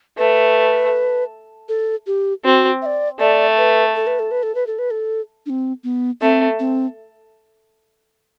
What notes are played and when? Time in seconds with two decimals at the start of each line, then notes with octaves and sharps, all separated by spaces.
0.18 A3 B4
1.69 A4
2.07 G4
2.44 C4 F#4
2.82 E5
2.86 D5
3.20 A3 D5
3.58 B4
3.95 A4
4.07 B4
4.19 A4
4.31 B4
4.43 A4
4.55 B4
4.67 A4
4.79 B4
4.91 A4
5.46 D4
5.50 C4
5.84 B3
6.21 A3 C4
6.60 C4